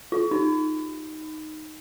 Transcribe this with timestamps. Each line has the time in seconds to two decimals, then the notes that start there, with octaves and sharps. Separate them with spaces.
0.12 F4
0.31 D#4